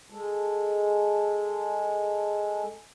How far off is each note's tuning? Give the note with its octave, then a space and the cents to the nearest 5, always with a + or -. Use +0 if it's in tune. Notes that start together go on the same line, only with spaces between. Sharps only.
G#3 +0 A4 +0